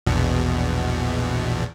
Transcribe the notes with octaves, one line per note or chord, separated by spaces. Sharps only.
A#1 E2 B2